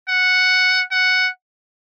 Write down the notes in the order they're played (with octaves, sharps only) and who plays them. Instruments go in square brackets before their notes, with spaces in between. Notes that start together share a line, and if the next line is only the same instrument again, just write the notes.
[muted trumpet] F#5
F#5